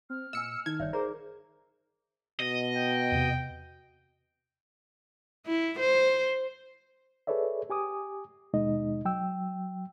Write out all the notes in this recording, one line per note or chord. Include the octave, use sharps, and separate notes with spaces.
C4 F6
A#2 D#5 G#5 E6 C#7
D#3 D#4 G#6
G1 C#5 D5 E5
G#4 A#4 C5 D5 A#5
B2 D#5
G5
E2 C3
E4
C5
G#4 A4 B4 C#5 D5 E5
G4 G#5 D6 D#6
D#2 B2 G#3 D#4 D#5
F#3 G5 E6